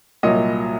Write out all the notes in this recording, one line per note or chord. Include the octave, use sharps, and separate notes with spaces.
C2 A#2 F#3 D#5